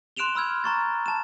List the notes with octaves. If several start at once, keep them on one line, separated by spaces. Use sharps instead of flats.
C6 F#6 D7 E7 F7 G7
B5 E6 F6 G#6
A#5 C#6 A6
A5 E7